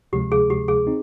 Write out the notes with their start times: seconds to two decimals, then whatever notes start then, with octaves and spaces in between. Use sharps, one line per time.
0.13 D2 C3 F3 G#3 G4
0.32 G#4
0.50 G4
0.68 G#4
0.87 C4 D#4